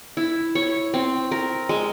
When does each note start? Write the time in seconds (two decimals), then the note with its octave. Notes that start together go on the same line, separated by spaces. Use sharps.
0.17 E4
0.55 C#5
0.94 C4
1.31 A#4
1.69 G#3